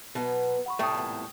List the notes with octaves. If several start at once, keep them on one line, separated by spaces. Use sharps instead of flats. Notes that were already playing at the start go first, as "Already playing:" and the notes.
B2 F#3 B3
F#5 B5 C#6
C2 A2 A3 D5 G5 C#6 D#6
E2 A#2